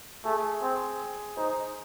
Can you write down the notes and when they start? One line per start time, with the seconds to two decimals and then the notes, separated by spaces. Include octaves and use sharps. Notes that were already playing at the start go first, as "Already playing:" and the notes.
0.25 A3 G#4
0.63 C4 G#4
1.37 D#4 C5